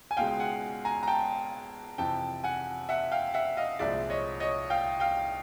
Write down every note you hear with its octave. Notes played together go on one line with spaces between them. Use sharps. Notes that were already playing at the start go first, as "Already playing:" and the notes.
G#5
C#2 B2 G#3 F5 G5
F#5 G#5
G#5 A#5
A#5
G5 A5
F2 C3 E3 G5 A5
F#5 G#5
E5 F#5
F5 G5
E5 F#5
D#5 F5
C2 A#2 F3 G#3 D5 E5
C#5 D#5
C#5 D#5
F5 G5
F5 G5